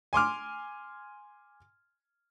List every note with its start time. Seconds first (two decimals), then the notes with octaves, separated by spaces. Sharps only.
0.13 G#5 C6 D6 F6